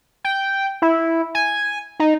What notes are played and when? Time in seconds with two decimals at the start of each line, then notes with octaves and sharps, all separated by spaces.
0.24 G5
0.82 E4
1.35 G#5
2.00 D#4